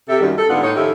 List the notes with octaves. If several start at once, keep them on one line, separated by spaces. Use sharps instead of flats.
C3 A4 E5
F#2 D#3 G3
A4
G#2 D3 G3 B3 F4 F#5
A2 D#4 C#5
D#3 F3 C#4 E4 G4 A4